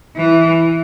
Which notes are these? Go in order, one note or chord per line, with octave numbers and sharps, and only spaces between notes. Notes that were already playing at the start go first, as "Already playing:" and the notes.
E3